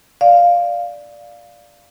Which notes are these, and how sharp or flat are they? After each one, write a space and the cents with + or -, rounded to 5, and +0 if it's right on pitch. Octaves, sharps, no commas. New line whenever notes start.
D5 +0 F5 +0